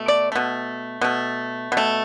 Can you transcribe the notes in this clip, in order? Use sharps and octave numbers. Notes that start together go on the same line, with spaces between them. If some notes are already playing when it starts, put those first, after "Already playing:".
Already playing: B2 A3
D5
B2 A3
B2 A3
B2
A3